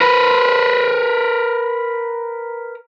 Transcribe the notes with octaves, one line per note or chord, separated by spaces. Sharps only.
A#4 B4